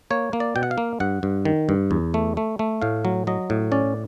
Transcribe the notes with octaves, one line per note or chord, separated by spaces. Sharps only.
A#3 C#5
A#3
D5
B2 G5
F#5
F5
A#3
G2 F#5
G2
D#3
G2
E2
A3
A3
A3
A2 F5
F#3
F#3 D#5
A2
C#4 D5